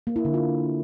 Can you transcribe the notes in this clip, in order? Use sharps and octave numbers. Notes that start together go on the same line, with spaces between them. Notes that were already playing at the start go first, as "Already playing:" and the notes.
A#3
E4
D3
F4